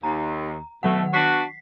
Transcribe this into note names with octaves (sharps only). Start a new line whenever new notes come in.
D#2 A#5
B2 D#3 F#3 A3 F#5
B3 D4 F#4 B6 C7